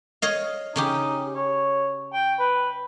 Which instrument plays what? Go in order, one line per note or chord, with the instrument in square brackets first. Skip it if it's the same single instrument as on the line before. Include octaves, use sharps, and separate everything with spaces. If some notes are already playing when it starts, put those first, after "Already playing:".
[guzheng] C#5 D#5 F5
[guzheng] C#3 C#4 G4 [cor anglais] D#4
[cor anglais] C#5
G5
B4